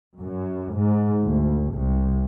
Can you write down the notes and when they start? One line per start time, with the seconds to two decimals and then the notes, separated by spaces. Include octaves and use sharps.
0.19 F#2
0.75 G#2
1.24 D2
1.74 C2